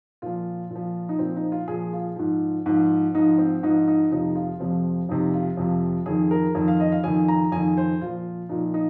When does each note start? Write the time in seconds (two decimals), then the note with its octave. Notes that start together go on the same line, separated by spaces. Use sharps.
0.22 A#2 F3 F4
0.70 A#2
0.75 F3
1.09 D#4
1.19 A#2 F3 C4
1.36 D#4
1.52 F4
1.68 A#2 F3 G#4
1.93 F4
2.16 G#2 F3
2.66 G#2 F3
3.14 G#2 F3 D#4
3.38 C4
3.63 G#2 F3 D#4
3.88 D#4
4.11 F2 C3 F3 D#4
4.35 F4
4.60 F2 C3 F3 C4
5.09 F2 C3 F3 D#4
5.34 F4
5.57 F2 C3 F3
6.06 F2 D#3 G#4
6.31 A#4
6.55 F2 D#3
6.68 F5
6.80 D#5
6.92 F5
7.04 F2 D#3 G#5
7.28 A#5
7.52 F2 D#3 G#5
7.77 C5
8.02 A#2 F3 F4
8.49 A#2 F3 D#4
8.74 D#4